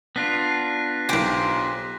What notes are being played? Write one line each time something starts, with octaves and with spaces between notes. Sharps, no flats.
B3 D4 F4 F#6 A#6 B6
B1 G4 C5 G#5